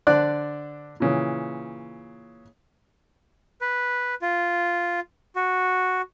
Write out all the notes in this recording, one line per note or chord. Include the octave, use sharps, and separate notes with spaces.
D3 D4 C5 D5 F#6
A#2 C#3 E3
B4
F4
F#4